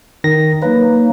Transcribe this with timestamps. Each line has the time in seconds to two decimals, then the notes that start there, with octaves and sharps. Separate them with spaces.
0.24 D#3 A#6
0.62 F#3 A#3 D#4 B4